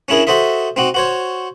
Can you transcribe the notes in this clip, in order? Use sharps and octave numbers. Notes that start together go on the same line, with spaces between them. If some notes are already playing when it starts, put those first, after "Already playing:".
C#4 D4 E4 G#4 A#4
F#4 A4 C5 D#5 E5
C4 D#4 F#4
F#4 C5 C#5